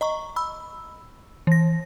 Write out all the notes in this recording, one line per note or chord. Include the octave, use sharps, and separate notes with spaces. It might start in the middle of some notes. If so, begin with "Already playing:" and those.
D#5 A#5 C#6
B5 E6
E3 A#6